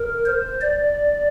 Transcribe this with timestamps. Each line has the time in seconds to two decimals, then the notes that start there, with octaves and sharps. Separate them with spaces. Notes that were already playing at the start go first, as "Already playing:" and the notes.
Already playing: A#4
0.26 C5
0.61 D5